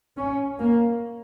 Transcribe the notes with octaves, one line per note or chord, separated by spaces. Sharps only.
C#4
A#3